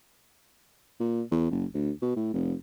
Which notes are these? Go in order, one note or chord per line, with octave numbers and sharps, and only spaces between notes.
A#2
E2
F#1
D2
B2
A2
F1